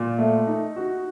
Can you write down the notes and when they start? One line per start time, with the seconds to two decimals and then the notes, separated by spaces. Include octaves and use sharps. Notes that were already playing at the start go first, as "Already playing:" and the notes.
Already playing: A#2
0.18 A3
0.47 D#4
0.76 F#4